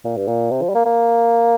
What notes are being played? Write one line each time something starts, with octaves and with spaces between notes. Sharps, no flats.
A#2
G2
A#2
C3
F3
G3
A#3
A#3